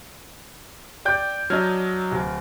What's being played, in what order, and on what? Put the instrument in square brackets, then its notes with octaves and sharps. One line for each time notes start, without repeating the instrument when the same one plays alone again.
[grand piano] D5 G5 G6
[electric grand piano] F#3 D4 D#5 [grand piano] F6 G#6
[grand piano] D1